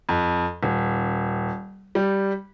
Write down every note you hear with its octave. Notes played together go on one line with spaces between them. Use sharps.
F2
D#1
G3